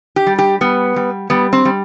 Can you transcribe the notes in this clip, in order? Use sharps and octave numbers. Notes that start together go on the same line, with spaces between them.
G4
G3
G4
G3 B3
G3
G3 B3
C4
G3